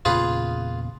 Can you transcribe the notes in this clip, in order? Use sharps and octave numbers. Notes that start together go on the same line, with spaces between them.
E2 A#2 C#3 F4 G#4 B4